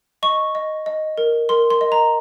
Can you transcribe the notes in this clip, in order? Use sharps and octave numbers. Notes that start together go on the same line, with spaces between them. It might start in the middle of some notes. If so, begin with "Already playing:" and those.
D#5 C#6
D#5
D#5
A#4
A#4 C6
C6
D#5
A#5